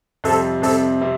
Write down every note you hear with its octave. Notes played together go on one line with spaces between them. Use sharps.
F2 C3 G3 C4 A4
F2 C3 G3 C4 A4
C3 G3 C4